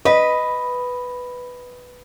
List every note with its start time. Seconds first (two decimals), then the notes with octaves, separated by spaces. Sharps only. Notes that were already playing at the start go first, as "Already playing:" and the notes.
0.05 B4 D#5